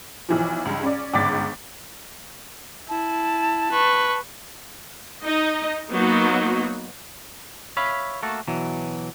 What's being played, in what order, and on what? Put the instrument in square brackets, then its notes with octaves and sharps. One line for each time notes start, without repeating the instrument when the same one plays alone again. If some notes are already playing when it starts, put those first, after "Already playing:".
[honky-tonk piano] B1 E3 F3
C#2 G2
C#4 D5
G1 C#2 G#2 D6 A6 B6
[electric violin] E4 [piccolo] A5
[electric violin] B4 C#6
[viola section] D#4 D#5
F#3 A#3 B3 D#4 F#4
[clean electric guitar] C#5 E5 F5 B5
A3 A#3 F#4 A4
B2 E3 F#3